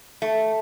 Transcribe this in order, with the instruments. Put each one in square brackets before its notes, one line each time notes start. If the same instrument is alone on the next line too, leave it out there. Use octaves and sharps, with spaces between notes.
[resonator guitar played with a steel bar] A3